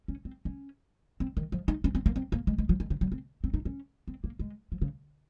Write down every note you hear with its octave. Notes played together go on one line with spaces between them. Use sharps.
C#4
C4
C#4
C4
D#3
F3
D#4
C#4
C4
A#3
C4
A#3
G#3
G#3
F3
D#3
C#3
F#3
C4
C4
D#4
C#4
C4
A#3
G#3
F3
C#3